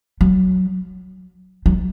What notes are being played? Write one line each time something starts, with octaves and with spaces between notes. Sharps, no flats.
F#3
F#3